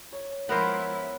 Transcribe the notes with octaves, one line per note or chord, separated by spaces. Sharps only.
C#5
F3 G#3 B3 E4 A#4 C5